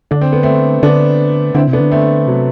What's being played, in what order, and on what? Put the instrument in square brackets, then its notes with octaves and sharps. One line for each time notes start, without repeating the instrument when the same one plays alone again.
[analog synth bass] D3 [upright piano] D4
[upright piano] C4
B3
A3 C4
[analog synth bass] D3 [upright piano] B3 D4
[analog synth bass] D3 [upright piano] C4 E4
[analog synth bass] C3
[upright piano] B3 D4
[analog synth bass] D3
[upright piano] A3 C4
[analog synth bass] C3 [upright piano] F#3 A3